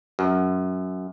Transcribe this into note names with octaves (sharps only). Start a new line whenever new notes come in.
F#2